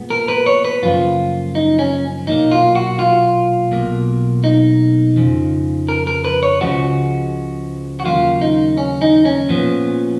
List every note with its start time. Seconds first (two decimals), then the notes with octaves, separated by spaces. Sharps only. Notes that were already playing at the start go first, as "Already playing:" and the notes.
Already playing: A#2 G#3 B3
0.10 A#4
0.28 B4
0.46 C#5
0.65 B4
0.82 F#2 C#3 F3 A#3 F4
1.55 D#4
1.79 C#4
2.27 B1 A#2 F#3 A#3 D#4
2.51 F4
2.75 F#4
2.99 F4
3.71 B1 B2 A#3
4.44 D#4
5.16 F2 C#3 F3
5.89 A#4
6.07 A#4
6.25 B4
6.43 C#5
6.61 C#2 C#3 F3 G#3 F#4
8.00 F#4
8.05 D#2 C#3 F#3 A#3 F4
8.41 D#4
8.77 C#4
9.02 D#4
9.25 C#4
9.49 A#2 F3 B3